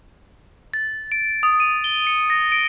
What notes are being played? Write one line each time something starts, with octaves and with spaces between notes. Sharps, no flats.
A6
D7
D#6
D#7
G7
C#7
A#6
D7